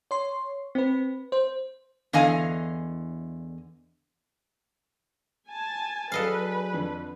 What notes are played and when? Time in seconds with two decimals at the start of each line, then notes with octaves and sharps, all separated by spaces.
0.11 C#5 C6
0.75 C4 B4
1.32 C5
2.13 E2 D3 D#5 F5 G#5
5.48 G#5 A5
6.12 F#3 D4 G#4 A4 B4 D#5 F5
6.73 F2 D3